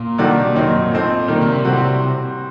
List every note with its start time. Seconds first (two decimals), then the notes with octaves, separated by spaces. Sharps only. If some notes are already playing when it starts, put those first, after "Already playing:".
Already playing: A#2
0.18 C3 D#3 G3 D4 F#4
0.55 F#2 D#3 F#3 C4 D#4
0.92 A#2 A3 C4 D#4
1.28 A#2 D#3 G3 A#3
1.41 D3
1.47 C3
1.65 A2 G3 C4 F#4